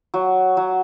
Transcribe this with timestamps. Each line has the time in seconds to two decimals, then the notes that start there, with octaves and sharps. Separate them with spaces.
0.14 F#3
0.57 F#3